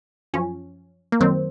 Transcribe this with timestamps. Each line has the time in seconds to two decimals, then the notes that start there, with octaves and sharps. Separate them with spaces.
0.33 F#2 F3 C#4
1.12 A#3
1.20 F#2 D#3 F#3 C4